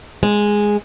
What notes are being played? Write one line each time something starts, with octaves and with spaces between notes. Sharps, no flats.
G#3